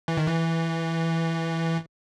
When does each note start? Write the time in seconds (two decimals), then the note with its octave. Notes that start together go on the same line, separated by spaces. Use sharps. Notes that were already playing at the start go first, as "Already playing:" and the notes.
0.08 E3
0.17 D#3
0.27 E3